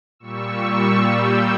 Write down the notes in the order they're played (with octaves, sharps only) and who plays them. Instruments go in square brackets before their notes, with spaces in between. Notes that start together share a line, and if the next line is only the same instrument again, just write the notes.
[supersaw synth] A#2 G3 C#6 E6
A#2 G3 E6 G6